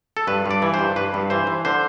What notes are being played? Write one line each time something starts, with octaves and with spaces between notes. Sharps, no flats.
A4
G2 B4
G2 D5
E3
C5
G2
G2 B4
G2
E3 C5
E3
D3 C5